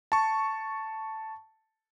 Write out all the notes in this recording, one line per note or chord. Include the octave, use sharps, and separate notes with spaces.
A5 C#6